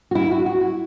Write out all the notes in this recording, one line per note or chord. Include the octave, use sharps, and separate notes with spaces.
F#4
E4
F#4
F#4
E4